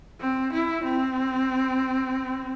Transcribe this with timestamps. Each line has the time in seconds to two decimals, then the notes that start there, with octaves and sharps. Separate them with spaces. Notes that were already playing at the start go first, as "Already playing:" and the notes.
0.20 C4
0.53 E4
0.84 C4